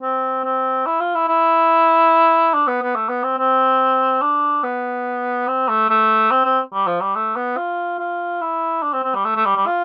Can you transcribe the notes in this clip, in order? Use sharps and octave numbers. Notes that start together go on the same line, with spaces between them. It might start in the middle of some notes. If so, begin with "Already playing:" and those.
C4
C4
E4
F4
E4
E4
D4
B3
B3
A3
B3
C4
C4
D4
B3
C4
A3
A3
C4
C4
G3
F3
G3
A3
B3
F4
F4
E4
D4
C4
C4
G3
A3
A3
G3
G3
F4